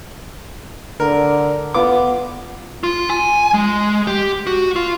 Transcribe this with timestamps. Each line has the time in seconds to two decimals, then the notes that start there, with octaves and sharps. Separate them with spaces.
1.00 D3 A#4
1.74 B3 F4 D6
2.84 F4
3.10 G#5
3.54 G#3
4.07 G4
4.47 F#4
4.76 F4